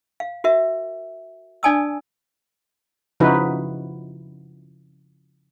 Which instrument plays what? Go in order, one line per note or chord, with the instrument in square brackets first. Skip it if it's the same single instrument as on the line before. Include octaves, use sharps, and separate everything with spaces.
[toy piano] F5
F#4 A#4 E5
D4 D5 G#5 A5 D#6 E6
[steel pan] C#3 F3 D#4 E4 F#4 B4